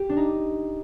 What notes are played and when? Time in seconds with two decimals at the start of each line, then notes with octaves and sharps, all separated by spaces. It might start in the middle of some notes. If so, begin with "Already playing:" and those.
Already playing: G4
0.09 D4
0.17 D#4